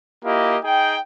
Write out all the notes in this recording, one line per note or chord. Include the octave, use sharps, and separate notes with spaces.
A#3 E4 F4 G4 D#5
D#4 G#4 G5